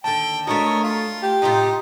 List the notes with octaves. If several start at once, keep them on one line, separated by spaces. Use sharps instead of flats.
D#2 D3 G5 A5
A3 D4 F#4 A#4 C#5 D#5
F4
G4
A2 C3 D#4 F4